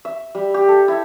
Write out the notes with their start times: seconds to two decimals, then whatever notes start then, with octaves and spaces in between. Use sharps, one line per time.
0.05 E5
0.35 G3
0.54 G4
0.68 A4
0.88 E4